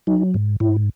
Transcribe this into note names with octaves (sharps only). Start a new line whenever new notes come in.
F#3 D#4
G#2
G#2 E4